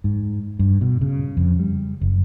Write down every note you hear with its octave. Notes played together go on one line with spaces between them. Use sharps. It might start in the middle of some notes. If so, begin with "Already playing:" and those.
G#2
G2
B2
C#3
F2
G3
F#1